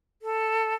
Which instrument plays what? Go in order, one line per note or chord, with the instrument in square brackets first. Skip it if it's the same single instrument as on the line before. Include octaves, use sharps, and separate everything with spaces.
[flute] A4